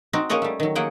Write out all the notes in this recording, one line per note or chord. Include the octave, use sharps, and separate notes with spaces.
C4 D#4 F#4
A#3 C#4 G#4 C#5 D#5 F#5
G3 A3
D#3 F#3
F#3 A#3 G#4 F#5 G5